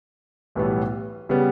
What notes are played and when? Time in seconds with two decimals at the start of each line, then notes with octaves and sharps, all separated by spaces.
0.55 B1 A2 E3 G3 B3
1.29 C#3 G3 B3